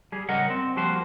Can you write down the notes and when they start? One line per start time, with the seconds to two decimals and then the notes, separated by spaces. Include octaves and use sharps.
0.12 G3 G#4
0.29 C#3 G3 A#4 D#5 F#5
0.50 C4
0.76 F3 G3 A#3 F#4 C5